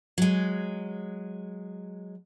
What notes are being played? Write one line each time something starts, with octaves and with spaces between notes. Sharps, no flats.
F#3 G#3